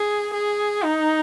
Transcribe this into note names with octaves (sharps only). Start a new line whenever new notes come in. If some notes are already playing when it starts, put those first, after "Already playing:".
Already playing: G#4
G#4
D#4